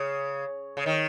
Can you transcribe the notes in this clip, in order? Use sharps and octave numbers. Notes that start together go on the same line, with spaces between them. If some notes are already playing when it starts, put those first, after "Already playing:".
Already playing: C#3
C#3
D#3